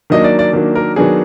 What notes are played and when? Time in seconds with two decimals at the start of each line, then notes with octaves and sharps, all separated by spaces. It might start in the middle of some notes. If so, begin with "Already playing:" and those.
0.10 D#3 F#3 A#3 D4 D#5
0.24 D5
0.39 D5
0.53 D#3 F#3 A#3 D4
0.75 A#4
0.96 D#3 F#3 B3 D4 G#4